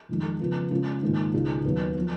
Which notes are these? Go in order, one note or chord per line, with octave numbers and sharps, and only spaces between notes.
F2 D#3 G#3 D#4
C#3 F3 B3 F4
C#3 G#3 C#4 F4
G#2 D#3 A#3 F4
C#2 B2 G#3 D#4
D#2 D#3 F#3 B3
F3 B3